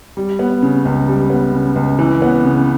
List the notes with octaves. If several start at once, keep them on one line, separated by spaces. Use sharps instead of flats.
G3
B3
C#3
C#2
G3
B3
C#3
C#2
E3
B3
C#3